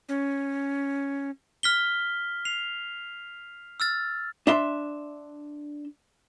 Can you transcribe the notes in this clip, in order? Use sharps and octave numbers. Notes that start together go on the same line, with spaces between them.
C#4
F6 B6 G7
C7 F7
E6 F6 A6
D4 E5 C6